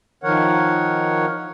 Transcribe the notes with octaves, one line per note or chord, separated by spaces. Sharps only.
D#3 F3 A#4 C#5 F#5